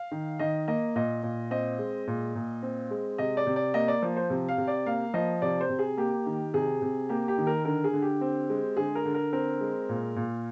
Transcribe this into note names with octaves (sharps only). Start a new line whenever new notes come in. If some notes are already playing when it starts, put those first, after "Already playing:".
Already playing: F5
D#3
D#3 D#5
A#3 D#5
A#2 D#5
A#2
C4 D#5
G#3
A#2
A#2
C4
G#3
C3 D#5
D5
C3
D5
A#3 D#5
D5
F3
C5
C3
F5
C3
D5
A#3 F5
F3 D#5
C3 D5
C5
C3
G#4
A#3 G4
D#3
C3 G#4
C3
A#3 G4
G4
D#3
A#4
D3 A#4
G#4
D3
G4
C4
G#3
D3 G#4
A#4
D3
A#4
C4 A#4
G#3
A#2
A#2